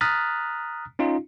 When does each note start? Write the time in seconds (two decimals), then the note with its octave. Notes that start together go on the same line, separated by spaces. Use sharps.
0.01 A#5 D#6 F6 F#6 A6 B6
0.99 C#4 D#4 F4